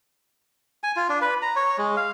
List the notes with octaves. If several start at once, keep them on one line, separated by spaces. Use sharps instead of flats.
G#5
F4
D4
B4
A#5
C#5
G#3
F5